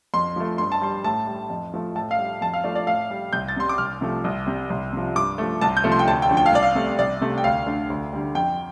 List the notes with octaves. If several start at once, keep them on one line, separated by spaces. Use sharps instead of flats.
F2 C6
F3 A3
G2 C6
A5
G3 C6
A2 A5
G3
F2
F3 A3
A2 A5
F5
G3
F2 A5
F5
F3 A3 D5
D5
A2 F5
G3
C2 G6
A6
C3 G3 C6
D6
C2 F6
C3 F3 A3
C2
C3 G3
C2
C3 F3
G2 D6
F3 A3
C2 A5
G6
C3 F3 A3
C6
G5
D2 A5
G5
D3 F3 A3
G5
F5
C2 D5
F5
C3 A3
C2 D5
C3 A3
G5
D2 F5
D3 A3
D2
D3 G3
F2 G5